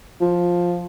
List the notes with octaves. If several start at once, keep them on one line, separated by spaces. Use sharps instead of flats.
F3